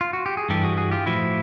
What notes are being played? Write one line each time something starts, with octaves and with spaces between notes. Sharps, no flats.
F4
F#4
G4
G#4
G2 E3 G3 G4 A4
F#4 G#4
F#4 G#4
F4 G4
A2 F3 E4 F#4